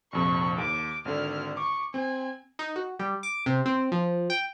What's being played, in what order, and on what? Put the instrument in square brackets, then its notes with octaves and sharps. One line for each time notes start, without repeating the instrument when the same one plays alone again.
[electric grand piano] A#1 F2 C3 [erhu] C#6
[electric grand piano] D#2 [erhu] D6
[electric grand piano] G#1 D3 [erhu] F6
[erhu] C#6 [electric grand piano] D6
[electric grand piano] C4 [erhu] G#5
[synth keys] D#4
F#4
G3
D6
C3
C4
F3
G5